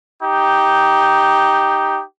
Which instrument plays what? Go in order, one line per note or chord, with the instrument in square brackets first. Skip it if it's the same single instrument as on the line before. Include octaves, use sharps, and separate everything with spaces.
[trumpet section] D#4 G4